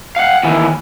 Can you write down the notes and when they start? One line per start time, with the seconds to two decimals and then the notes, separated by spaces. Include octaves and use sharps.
0.16 F5 F#5
0.43 D#2 E3